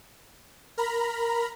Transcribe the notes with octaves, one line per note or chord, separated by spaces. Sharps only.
A#4 A#5 B5